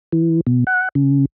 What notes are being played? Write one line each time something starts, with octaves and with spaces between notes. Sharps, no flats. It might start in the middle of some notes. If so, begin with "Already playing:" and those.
E3
B2
F#5
C#3